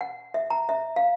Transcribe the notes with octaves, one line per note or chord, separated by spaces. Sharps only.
F#5
E5
A#5
E5
F5